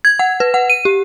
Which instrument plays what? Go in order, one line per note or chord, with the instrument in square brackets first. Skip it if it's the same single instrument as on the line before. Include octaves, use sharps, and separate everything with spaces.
[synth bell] G#6
F#5
B4
F#5
D#7
G4